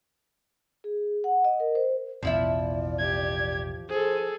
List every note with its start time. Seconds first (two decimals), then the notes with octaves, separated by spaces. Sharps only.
0.84 G#4
1.24 F#5
1.44 D#5
1.60 A#4
1.75 C5
2.23 A1 E2 B2 F3 E4 D5 E5
2.99 G4 G#6
3.90 G#4 A4 C5